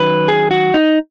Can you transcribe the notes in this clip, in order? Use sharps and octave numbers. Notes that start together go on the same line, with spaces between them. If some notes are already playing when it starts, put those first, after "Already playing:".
Already playing: F#2 D#3 F#3 B4
G#4
F#4
D#4